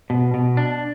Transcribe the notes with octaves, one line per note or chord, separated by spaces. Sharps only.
B2
B2
D4